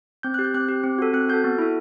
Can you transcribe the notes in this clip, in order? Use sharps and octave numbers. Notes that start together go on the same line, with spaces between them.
C4 G6
G4 F#6
G6
C4 F#6
G4
C4
F#4 A4
C4 F#6
F#4 A4 G6
B3
E4 A4